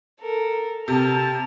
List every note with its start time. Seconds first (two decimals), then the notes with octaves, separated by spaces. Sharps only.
0.21 A4 A#4
0.88 C3 A4 G5 A5 F6